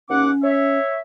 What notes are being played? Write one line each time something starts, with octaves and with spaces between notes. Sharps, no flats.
D#2 C#4 F#5 D6
C#5 E5